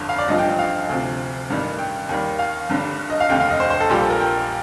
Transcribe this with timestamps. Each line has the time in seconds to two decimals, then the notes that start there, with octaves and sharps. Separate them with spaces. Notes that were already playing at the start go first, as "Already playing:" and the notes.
Already playing: G1 F2 D3
0.09 F5
0.19 D5
0.28 A1 G2 D3 F3 D#5
0.39 G5
0.59 F5
0.89 D2 C3 F3
1.50 A1 G2 D#3 G3
1.79 G5
2.09 D#2 D#3 G3
2.39 F5
2.69 G1 G2 D3 G3
3.10 D#5
3.20 F5
3.29 F1 D#2 D3 G5
3.40 F5
3.51 D#5
3.60 C5
3.70 C5
3.80 A4
3.89 A#1 A#2 G3 G4
4.00 A4
4.10 A#4
4.20 G5